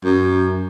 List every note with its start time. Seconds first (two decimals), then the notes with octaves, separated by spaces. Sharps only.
0.05 F#2